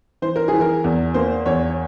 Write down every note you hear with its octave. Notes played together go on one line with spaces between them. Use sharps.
E3 C5
A#4
E3 G#4
A#4
E2
A#3 C5
E2 C#5